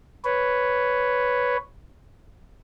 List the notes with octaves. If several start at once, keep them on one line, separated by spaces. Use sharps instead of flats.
B4 C#5